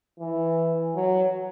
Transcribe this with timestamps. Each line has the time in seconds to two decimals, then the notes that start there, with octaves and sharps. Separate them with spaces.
0.20 E3
0.96 F#3